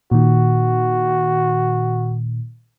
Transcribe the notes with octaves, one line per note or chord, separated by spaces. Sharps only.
A#2 D#3 F#4